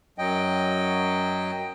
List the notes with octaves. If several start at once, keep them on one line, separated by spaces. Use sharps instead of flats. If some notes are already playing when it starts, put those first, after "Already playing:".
F#2 F#3 D#5 G5